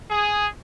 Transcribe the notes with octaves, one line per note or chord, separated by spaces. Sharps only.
G#4